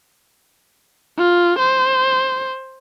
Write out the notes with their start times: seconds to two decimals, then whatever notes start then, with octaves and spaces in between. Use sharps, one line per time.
1.18 F4
1.59 C5